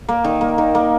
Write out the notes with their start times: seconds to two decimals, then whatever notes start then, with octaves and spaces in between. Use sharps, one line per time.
0.09 A#3
0.24 D#3
0.41 A#3
0.58 D#3
0.75 A#3